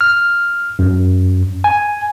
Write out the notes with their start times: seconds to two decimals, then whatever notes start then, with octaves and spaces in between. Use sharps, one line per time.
0.01 F6
0.79 F#2
1.64 G#5